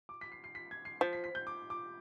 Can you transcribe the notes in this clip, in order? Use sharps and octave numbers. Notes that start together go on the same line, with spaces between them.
D6
B6
C7
C7
B6
G#6
C7
F3 B6
B6
B6
G6
D6
D6